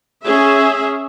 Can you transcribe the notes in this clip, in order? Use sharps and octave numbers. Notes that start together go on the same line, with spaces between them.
C#4 G#4 E5